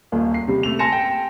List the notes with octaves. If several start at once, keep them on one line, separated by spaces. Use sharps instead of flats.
D#1 D#2
C7
C3 G3
A3 F7
G#5 A5 C6 A#6 C#7 E7
G5